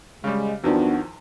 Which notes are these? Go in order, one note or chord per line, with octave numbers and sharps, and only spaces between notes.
C#3 G3 G#3
E2 D#3 F3 B3 D4 F#4